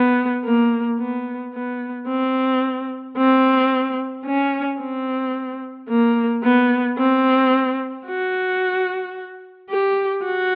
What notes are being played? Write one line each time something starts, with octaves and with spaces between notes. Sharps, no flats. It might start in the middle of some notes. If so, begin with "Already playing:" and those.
Already playing: B3
A#3
B3
B3
C4
C4
C#4
C4
A#3
B3
C4
F#4
G4
F#4